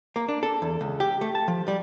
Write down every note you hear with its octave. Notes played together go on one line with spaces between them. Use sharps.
A#3
D4
A4
E2
C#2
G4
A3
A5
F3
G3